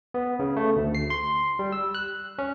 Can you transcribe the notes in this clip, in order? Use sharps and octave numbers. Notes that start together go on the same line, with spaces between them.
B3
C#3
A3
D2
C7
C6
G3
E6
F#6
C#4